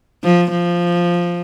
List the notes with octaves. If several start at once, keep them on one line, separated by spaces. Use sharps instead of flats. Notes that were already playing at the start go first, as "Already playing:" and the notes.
F3
F3